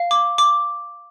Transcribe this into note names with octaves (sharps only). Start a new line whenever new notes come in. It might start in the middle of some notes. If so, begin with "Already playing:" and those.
Already playing: F5
D6
D6